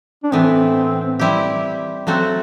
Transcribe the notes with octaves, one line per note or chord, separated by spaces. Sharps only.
D4
A2 E3 B3 C4
G3 C4 E4 G4
F#3 A3 C4 F#4 A4